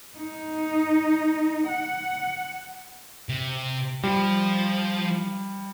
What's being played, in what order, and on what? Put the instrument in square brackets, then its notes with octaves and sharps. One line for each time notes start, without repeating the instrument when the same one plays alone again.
[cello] D#4
F#5
[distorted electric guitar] C3
[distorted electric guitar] F3 [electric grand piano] G3